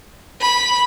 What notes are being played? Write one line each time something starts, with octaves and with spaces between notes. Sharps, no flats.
B5